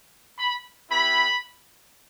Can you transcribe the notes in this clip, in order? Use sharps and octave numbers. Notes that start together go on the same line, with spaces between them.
B5
B3 E4 G4 B5